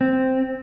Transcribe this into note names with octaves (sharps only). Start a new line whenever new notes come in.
C4